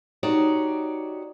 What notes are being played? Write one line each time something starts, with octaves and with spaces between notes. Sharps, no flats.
D#4 F#4 G4 C#5 D5